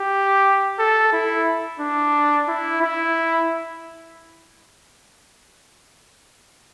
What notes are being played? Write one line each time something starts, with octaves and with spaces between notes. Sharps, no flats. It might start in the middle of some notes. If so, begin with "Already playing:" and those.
Already playing: G4
A4
E4
D4
E4
E4